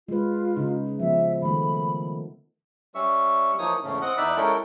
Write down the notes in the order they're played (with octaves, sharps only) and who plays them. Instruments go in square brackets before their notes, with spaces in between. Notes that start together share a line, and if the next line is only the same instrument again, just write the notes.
[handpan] G#3 B4 [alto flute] F4
[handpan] C#3 D#4
[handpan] F3 B3 [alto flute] E5
[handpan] D#3 A3 [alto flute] B5
[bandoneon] G3 C#4 E5 C#6
E3 F3 A#3 D#4 C#5 D#6
E2 G#2 C#3 A3 C#4
C4 D#5 F#5
E2 D#4 D5 E5 B5 F#6
G#3 C#4 E4 A4 A#4 G5